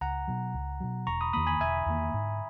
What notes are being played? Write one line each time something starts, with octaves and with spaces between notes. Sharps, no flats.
C#2 F#5 A#5
B2 F#3
C#2
B2 F#3
E1 A#5 C#6
B5 D#6
E2 D#3 A#3 B5 D#6
G#5 B5
E1 E5 G#5
E2 D#3 A#3
G#2